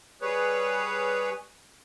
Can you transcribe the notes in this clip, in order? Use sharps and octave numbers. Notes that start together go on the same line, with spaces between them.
G3 G#4 B4 C#5